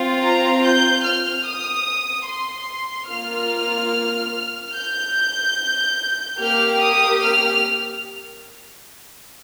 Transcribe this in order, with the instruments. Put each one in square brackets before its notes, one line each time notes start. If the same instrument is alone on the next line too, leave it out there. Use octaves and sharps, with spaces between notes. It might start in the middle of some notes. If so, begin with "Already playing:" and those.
Already playing: [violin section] C4 F4
A#5
G6
F6
D#6
C6
A#3 F4 F6
G6
A#3 G4 F6
D#6
F6